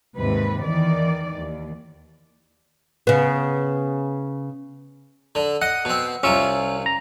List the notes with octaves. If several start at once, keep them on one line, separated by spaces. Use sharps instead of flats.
D#2 G#2 C3 B4
E2 D#3 E3 D5
D#2
C#3 B3
D3
D#5 F#5
B2 C4
C2 C3 C#4 F4 C#6 E6
A#5